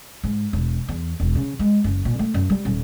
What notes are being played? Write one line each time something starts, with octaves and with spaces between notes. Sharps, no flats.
G#2
E1
E2
E1
C#3
G#3
F#1
A#2
A3
F#2
G3
D#1